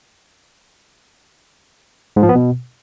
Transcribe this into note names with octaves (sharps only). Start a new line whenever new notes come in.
G#2
F3
B3
B2